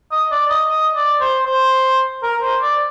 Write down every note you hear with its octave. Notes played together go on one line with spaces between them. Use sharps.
D#5
D5
D#5
D#5
D5
C5
C5
A#4
C5
D5